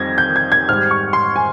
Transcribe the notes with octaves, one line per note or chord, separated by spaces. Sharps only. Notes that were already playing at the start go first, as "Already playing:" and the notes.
Already playing: F2 D#3 G3 G#6 A#6
G6
G#6
G#6
G#2 G3 F6
C#6
C6
G#5